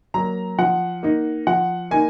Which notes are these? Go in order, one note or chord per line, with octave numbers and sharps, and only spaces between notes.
F#3 A#3 A#5
F3 F#5
A#3 D#4
F3 F#5
A#3 D#4 G#5